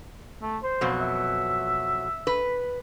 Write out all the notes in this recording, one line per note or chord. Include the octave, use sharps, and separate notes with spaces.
A3
C5
F2 B2 F#3
E5
B4